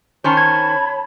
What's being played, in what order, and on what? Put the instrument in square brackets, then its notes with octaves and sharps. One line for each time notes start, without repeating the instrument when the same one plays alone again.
[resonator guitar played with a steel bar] D#3 C#4 C5 [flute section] C#5 A5 B5
[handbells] G#6